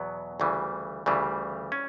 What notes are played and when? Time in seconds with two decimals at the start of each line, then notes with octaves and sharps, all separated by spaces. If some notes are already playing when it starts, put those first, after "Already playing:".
Already playing: E2 B2 F#3 B3
0.40 D2 C#3 E3 G3
1.06 D2 C#3 E3 G3
1.72 C#4